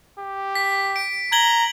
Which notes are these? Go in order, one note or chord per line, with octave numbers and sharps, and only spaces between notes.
G4
B6
D7
A#5 G#6 F#7 G7